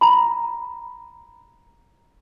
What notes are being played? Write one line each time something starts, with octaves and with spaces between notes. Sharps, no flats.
A#5 B5